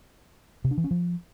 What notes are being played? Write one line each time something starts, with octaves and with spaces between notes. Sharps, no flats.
C3
D4
E3
C#4
F3